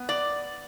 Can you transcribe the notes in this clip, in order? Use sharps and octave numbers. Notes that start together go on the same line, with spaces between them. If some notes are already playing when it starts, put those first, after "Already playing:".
Already playing: B3
D5